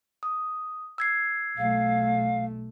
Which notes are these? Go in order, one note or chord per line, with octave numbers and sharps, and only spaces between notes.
D#6
E6 G#6 C7
B1 A3 F5